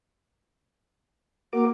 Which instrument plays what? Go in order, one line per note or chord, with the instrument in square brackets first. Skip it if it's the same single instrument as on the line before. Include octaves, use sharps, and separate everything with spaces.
[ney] A#3 [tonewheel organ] F#4 A#4 D6